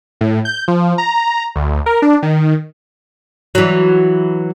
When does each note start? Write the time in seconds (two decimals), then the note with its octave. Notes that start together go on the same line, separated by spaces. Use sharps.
0.21 A2
0.45 G6
0.68 F3
0.98 A#5
1.56 D2
1.86 A#4
2.02 D4
2.23 D#3
3.55 E3 F#3